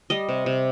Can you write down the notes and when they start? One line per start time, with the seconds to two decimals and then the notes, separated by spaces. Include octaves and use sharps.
0.10 G3 D#5
0.29 C3
0.46 C3